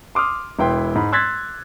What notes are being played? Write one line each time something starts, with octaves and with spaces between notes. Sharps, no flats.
C6 D6 D#6 F6
E1 E4 B4 G5 C6
G#2 B5
C6 E6 F#6 G#6 A6 B6